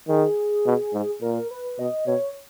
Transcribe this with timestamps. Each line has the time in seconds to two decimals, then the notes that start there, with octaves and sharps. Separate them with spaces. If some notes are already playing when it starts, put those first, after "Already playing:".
0.08 D#3 G#4
0.66 B2
0.93 G#2
1.21 A#2 A#4
1.51 B4
1.79 B2 D#5
2.06 B2 C#5